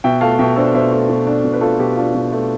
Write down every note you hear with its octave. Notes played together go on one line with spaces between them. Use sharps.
B2 E5 G5
A3 F5 A5
B2 E5 G5
D4 A4 C5
B2 C5 E5
A3
B2
D4
B2
B4
A3 F4 A4
B2 G4
D4 F4
B2
A3